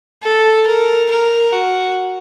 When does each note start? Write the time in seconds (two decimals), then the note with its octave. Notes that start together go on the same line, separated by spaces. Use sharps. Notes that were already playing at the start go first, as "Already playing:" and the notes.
0.23 A4
0.67 A#4
1.11 A#4
1.53 F#4